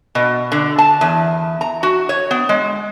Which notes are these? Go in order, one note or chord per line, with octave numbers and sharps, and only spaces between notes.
B2
D3
A5
E2
A#5
F#4
C#5
B3
G#3